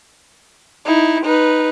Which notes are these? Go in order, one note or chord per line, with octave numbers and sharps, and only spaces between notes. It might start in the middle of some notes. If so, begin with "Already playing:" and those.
D#4 E4
D#4 B4